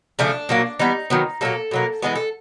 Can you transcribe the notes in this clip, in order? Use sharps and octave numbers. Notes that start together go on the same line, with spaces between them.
C#3 F3 A3 D4
A#2 F#3 A#3
E3 G3 B3 D#4
D#3 F#3 B3
A#2 F#3 A#3 A4
B2 F#3 A#3
E3 G#3 B3 G#4
A4